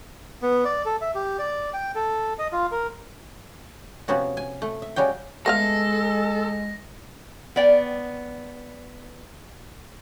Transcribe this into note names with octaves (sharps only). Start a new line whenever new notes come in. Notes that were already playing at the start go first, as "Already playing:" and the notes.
B3
D5
A4
E5
G4
D5
G5
A4
D#5
F4
A#4
C3 F3 B3 C#4 F#4
G#5
A3
E5
C#3 G3 C#4 F#4 G5
G#3 A3 B3 A4 F5 A#6
B3 D5 G5